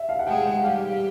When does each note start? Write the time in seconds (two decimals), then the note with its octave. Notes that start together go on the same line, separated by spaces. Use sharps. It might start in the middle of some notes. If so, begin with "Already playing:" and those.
Already playing: E5
0.09 F5
0.19 F#5
0.27 G#3 G#4 G5
0.46 F#5
0.63 G3 G4 F5